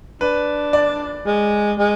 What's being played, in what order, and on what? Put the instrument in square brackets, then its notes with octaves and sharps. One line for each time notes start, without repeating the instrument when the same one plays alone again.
[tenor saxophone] D4 [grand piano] B4
[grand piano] D5
[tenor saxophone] G#3
G#3